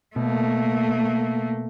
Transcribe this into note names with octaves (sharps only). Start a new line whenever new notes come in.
B2 A3 A#3